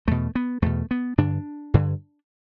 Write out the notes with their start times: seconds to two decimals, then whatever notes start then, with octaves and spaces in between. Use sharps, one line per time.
0.07 E2 B2 A3
0.35 B3
0.62 E2 B2 A3
0.91 B3
1.18 G2 D3 D4
1.74 G2 D3